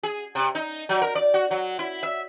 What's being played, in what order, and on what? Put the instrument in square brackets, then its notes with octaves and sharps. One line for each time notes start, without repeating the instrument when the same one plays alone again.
[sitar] G#4
C3
D#4
F#3
A#4
D5
F#4
F#3
E4
E5